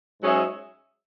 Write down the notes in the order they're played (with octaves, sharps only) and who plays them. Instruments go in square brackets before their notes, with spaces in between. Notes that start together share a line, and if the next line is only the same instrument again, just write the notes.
[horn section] G#2 F#3 C#4 G#4 E5